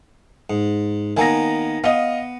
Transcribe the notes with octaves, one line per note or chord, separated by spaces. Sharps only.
G#2
D#3 A#3 B3 G#5 A#5 A#6
B3 D#5 F5